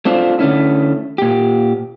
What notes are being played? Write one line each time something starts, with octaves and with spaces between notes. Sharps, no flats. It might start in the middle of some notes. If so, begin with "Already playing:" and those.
A3 C4 D4 F4
D3 A3 C#4 E4
A#2 G4